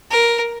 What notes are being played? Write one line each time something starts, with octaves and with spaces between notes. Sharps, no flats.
A#4